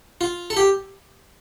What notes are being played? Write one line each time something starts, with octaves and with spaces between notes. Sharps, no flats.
F4
A4
G4